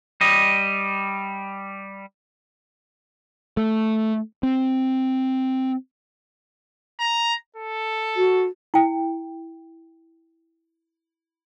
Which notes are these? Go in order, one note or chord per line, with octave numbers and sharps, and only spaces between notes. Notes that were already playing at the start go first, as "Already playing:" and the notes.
G3 D#5
A3
C4
A#5
A4
F#4
E4 G5